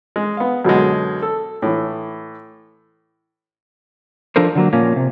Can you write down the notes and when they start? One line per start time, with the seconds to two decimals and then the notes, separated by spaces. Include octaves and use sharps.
0.16 G#3
0.37 B3 F5
0.65 F#2 B2 D3 G#3
1.22 A4
1.62 A2 E3
4.36 F3 D4 A4 A#4 C5
4.55 D3 F#3 A#3
4.73 A#2 F3 A#3 C#4
4.96 C3